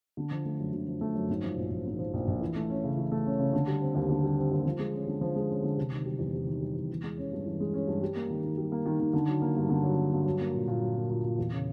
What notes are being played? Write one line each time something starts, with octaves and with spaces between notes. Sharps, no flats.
D3
F3
A3
F#2
D3
F3
A3
F#2
G#2
F3
A#1
A#1
G#2
F3
A#1
A#1
E3
A3
C#4
C#3
E3
A3
C#4
C#3
D3
G3
C4
D#2
D3
G3
C4
D#2
F3
G#3
C#4
D3
F3
G#3
C#4
D3
C3
D#3
G3
E2
C3
D#3
G3
E2
E3
G#3
C#4
G2
E3
G#3
C#4
G2
G3
A#3
D#3
D#3
G3
A#3
D#3
D#3
D3
F#3
A#3
G2
D3
F#3
A#3
G2
F#3
A#3
A#2
A#2
F#3
A#3
A#2
A#2
E2
C#3